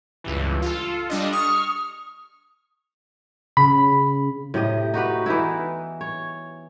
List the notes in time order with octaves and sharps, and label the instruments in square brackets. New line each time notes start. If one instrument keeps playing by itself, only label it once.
[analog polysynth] C#2 G2 E3
F4 A4
G3 D4 D#5
[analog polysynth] C#6 F6 [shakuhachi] D#6
[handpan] C#3 [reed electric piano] B5
[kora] A2 C3 G4 D#5
D#4 F#4 G4 B4
E3 B3 D#4 E4
C#5